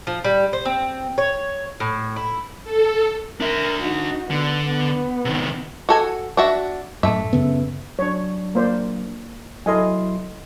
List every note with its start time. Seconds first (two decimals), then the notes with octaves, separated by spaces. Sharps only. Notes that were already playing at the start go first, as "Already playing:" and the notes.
0.07 F3
0.24 G3
0.53 C5
0.65 C4
1.18 C#5
1.80 A2
2.16 E4
2.64 A4
3.40 D4 A#4 E5
3.82 D#4 F#4
4.31 D3 B3
4.64 B3
5.25 C3 D#3
5.89 F#4 A4 G#5
6.37 D4 F#4 E5
7.03 F#2 A2 A3 E5
7.33 F#2 C#3 B3
7.99 F#3 D4 C#5
8.55 A#3 C5 D5
9.66 F#3 E4 A4 D#5 G#5 C6